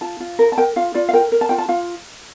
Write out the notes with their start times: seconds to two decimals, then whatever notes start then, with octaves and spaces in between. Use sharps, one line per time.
0.01 F4 A5
0.20 F4
0.39 A#4
0.52 A5
0.58 A#4 G5
0.76 F4 F5
0.94 F4 D5
1.09 F5
1.13 A#4 G5
1.32 A#4
1.41 A5
1.49 F4 G5
1.58 A5
1.69 F4 F5